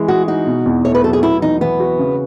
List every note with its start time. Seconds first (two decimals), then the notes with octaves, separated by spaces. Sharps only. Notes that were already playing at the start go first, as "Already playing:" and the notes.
Already playing: E3 G#3
0.08 F#4 G#4
0.28 D#4 F#4
0.47 B2
0.66 E2
0.85 A3 C#5
0.95 B4
1.04 F#3 A4
1.13 G#4
1.23 B3 E4
1.42 E3 D#4
1.61 E3 B3
1.80 F#4
1.99 C#3